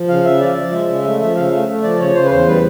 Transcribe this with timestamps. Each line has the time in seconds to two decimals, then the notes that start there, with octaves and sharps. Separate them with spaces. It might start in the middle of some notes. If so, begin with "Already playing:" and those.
Already playing: F3
0.08 C#3 F5
0.24 C#3 E5
0.40 F3 D5
0.56 F3
0.72 G#3 E5
0.88 C#3
1.04 A3 E5
1.20 F3 E5
1.35 C#3 F5
1.51 A3 E5
1.68 A3
1.83 F3 D5
1.99 C#3 C#5
2.15 C#3 C5
2.24 B4
2.31 E2 C5
2.47 G3 B4